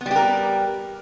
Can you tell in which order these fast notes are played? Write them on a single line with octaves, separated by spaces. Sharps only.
B3 G3 G4 A#4